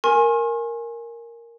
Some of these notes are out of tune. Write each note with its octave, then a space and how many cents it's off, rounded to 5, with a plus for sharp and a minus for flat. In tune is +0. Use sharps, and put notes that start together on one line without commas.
A#4 +0 G#5 +0 C6 +45